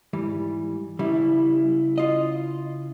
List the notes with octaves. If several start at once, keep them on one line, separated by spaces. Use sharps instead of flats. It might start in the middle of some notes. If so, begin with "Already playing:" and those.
G#2 E3 G3
C#3 G3 E4
F4 D#5